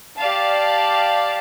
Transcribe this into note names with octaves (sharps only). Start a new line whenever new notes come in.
G4 D5 F5 A5